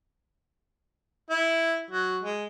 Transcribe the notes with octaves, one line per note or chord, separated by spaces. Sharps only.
E4
F#3
G#3